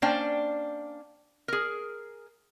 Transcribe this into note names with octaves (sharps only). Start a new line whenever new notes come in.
A#3 C#4 D4 C5 D5 G5
G#4 A#4